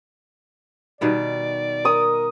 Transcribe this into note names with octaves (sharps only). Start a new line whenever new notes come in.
B2 D#3 G3 D5
A#4 D#6